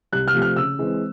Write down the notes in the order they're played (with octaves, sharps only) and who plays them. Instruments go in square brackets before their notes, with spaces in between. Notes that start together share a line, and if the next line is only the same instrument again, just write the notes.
[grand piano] C2 F#6
F6
C3 F3 A3
F6
C#3 E6
E3 G#3 C4